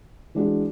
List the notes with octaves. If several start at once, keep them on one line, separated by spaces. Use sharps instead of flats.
E3 G#3 D4 F#4